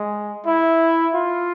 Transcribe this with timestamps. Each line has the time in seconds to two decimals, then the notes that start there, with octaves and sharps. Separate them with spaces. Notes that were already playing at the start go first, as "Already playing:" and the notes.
Already playing: G#3
0.46 E4
1.14 F4